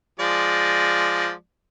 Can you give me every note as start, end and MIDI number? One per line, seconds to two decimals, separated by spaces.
0.20 1.32 53
0.20 1.32 56
0.20 1.32 74